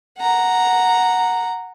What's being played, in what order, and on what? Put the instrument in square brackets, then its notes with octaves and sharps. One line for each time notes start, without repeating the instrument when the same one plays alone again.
[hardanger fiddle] F#5 A#5